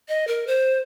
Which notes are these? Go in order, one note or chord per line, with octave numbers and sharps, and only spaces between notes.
D#5
A#4
C5